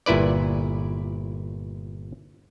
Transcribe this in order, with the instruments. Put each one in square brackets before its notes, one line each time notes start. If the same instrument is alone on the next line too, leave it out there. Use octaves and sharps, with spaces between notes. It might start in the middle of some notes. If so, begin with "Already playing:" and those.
[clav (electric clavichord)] G1 A#2 E4 B4 D5